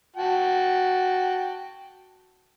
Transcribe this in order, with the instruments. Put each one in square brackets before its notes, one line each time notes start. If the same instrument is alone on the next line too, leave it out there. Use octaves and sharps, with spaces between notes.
[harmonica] F#4 G5 A5